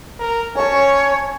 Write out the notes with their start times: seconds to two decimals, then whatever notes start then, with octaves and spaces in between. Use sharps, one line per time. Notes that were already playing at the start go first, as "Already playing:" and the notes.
0.20 A#4
0.55 C#4 C#5 G#5 A5